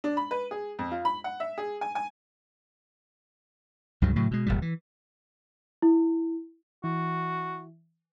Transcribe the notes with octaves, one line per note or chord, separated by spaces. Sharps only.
D4
B5
B4
G#4
F2
F4
B5
F#5
E5
G#4
G#5
G#5
C#2 G2 C#3 F#3
A2 C#3 F#3
B2 G#3
D1 G1 A#2 G3
E3
E4
E3 F#4